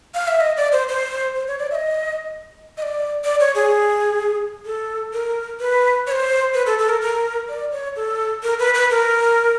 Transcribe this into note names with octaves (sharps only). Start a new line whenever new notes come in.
F5
E5
D#5
D5
C5
C5
C5
C#5
D5
E5
D#5
D#5
D5
D5
C#5
G#4
A4
A#4
B4
C#5
C5
B4
A4
A4
A#4
A#4
D5
C#5
A4
A#4
B4
B4
A#4